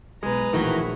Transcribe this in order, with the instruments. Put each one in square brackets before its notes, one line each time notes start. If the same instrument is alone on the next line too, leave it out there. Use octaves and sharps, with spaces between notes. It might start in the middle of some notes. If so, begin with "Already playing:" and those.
[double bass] B1 [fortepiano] G#3 [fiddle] B4 A#5
[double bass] A#1 [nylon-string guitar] A2 E3 [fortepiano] D#3 F#4